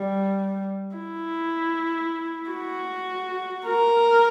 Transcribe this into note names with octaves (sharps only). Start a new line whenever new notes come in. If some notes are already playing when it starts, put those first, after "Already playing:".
Already playing: G3
E4
F#4
A#4